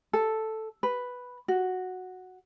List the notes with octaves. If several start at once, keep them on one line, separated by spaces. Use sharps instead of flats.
A4
B4
F#4